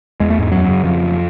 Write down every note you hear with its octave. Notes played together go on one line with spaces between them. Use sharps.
E2 G#3
A3
G#2 G#3
F#2 F#3
C#3
F2 F3